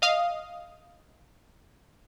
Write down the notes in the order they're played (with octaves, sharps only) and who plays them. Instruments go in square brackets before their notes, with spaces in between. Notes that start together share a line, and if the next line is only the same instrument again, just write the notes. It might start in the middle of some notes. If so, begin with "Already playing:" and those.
[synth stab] D#5 F5 D#6